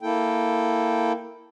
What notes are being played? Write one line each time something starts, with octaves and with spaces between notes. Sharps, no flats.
A#3 E4 A4 G5